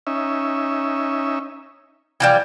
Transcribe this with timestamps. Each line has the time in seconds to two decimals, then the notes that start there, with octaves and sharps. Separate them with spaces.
0.07 C#4 D#4 E5
2.20 E3 F3 G3 F#5